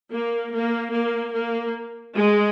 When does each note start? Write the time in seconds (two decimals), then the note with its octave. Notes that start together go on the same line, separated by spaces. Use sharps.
0.14 A#3
0.54 A#3
0.93 A#3
1.34 A#3
2.14 G#3